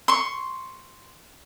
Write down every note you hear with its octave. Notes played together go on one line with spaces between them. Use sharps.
C6 C#6